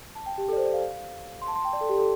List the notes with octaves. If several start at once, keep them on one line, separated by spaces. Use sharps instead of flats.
A5
G5
G4
A4
D5
C5
D5
F5
C6
A5
C6
G5
D5
A4
G4
A4